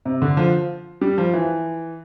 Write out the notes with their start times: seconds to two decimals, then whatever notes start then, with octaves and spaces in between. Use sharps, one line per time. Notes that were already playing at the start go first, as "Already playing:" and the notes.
0.05 C3
0.22 D3
0.37 F3
1.01 G3
1.18 F3
1.33 E3